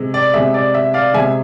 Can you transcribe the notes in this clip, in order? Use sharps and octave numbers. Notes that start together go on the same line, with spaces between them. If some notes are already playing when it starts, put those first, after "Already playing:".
Already playing: C3 G#3
D5
C3 G#3 E5
D5
E5
D5 F5
C3 G#3 E5 G#5